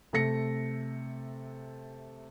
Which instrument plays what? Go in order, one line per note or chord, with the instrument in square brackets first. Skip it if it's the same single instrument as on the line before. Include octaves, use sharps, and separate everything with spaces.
[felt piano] C3 A3 A4 A#6 C#7